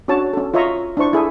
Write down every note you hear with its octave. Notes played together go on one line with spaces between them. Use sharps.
C#4 D4 F#4 C#5 A5
C#4 A4
F4 C#5 D#5 E5 A#5 C#6
D4 E4 C5 C#6
E4 G#4 A4 E5